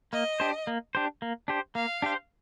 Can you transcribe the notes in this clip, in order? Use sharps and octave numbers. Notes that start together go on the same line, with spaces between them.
A#3 D#5
D4 G4 C5
A#3
D4 G4 C5
A#3
D4 G4 C5
A#3 F5
D4 G4 C5